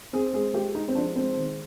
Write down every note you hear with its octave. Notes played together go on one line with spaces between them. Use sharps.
C4 G#4
G#3 G#4
G#3 G4
G#3 D#4
C4
F3 D4
G#3 C4
D#3